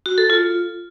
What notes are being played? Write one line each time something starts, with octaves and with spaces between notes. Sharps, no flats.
F#4
A4
F4